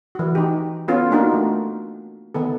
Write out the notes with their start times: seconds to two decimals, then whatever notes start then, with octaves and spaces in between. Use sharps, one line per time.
0.15 E3 F#4
0.35 D#4 G4
0.88 B3 C#4 F4 A4
1.11 A#3 D4 D#4 F4 F#4 A#4
1.34 A3
2.35 D#3 B3 A4